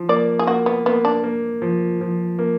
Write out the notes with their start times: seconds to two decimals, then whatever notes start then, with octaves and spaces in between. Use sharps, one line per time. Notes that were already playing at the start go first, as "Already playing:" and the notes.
Already playing: F3
0.09 A#3 D5
0.39 G#4
0.47 A#3 F#4
0.66 B3
0.86 A#3 B3
1.05 D4
1.24 A#3
1.62 F3
2.01 F3
2.39 A#3